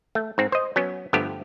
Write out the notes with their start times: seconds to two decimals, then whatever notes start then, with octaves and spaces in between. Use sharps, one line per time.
0.15 A3
0.38 G#2 C4
0.52 C5 D#5
0.76 F#3 B3 C#4
1.13 G1 G2 F3 A3 B3 G4